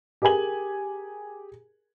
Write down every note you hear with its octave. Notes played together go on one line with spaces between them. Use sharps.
G4 G#4 A#4 G#5 F#7